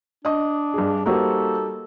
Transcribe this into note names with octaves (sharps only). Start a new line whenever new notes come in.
D4 D#5 D#6
G2 G#4
G3 A#3 D#4 F#4 A4 C5